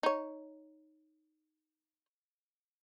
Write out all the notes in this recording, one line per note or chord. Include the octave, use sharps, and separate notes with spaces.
D#4 C#5